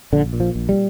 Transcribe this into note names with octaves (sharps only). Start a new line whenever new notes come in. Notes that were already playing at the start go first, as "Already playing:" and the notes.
A#1 D3
A#2
F3
A#1
G3